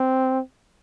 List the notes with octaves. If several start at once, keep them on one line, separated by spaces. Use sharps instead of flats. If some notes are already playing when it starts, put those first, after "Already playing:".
Already playing: C4